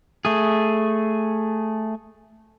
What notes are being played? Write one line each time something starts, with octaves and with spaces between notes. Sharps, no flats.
A3 G#4